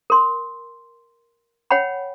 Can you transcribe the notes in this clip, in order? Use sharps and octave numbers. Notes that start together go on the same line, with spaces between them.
A#4 C6
C#5 F#5 G5 B5